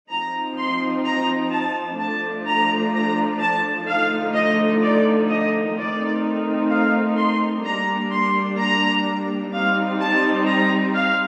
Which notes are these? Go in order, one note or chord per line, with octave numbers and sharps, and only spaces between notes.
F3 C4 D#4 A#5
C6
A#5
A5
F3 A3 D4 A5
A#5
A#5
A5
D3 F3 A3 D#4 F5
D#5
D5
D#5
D#3 A3 C4 D#4 D5
F5
C6
G3 A#3 D4 A#5
C6
A#5
G3 C4 D#4 F5
A5
A#5
F5